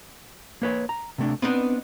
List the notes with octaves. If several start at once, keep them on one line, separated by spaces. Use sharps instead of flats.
A#3 B4 C#5
A#5
C3 A3 D4
B3 C4 D4 D#4